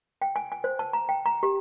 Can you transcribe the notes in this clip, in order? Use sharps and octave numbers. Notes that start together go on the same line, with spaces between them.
G5
G#5
G#5
C5
A5
A#5
G5
A#5
G4